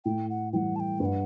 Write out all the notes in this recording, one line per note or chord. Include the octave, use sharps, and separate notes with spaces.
A2 G5
F#5
E3 G3 F#5 G5
A5
G5
G2 G5
F#5